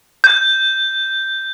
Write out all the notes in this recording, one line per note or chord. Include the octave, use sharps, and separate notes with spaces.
G6